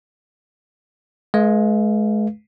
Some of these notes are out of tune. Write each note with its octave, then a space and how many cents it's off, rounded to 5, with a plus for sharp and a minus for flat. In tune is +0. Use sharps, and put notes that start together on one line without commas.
G#3 +35 B4 -30 F5 -10